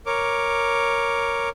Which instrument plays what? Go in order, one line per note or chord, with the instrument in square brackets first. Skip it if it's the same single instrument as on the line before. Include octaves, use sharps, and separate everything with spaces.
[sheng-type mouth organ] A#4 C#5 D6